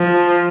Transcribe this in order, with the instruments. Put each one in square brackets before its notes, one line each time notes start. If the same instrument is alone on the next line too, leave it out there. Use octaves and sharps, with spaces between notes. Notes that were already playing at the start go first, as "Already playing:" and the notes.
Already playing: [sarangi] F3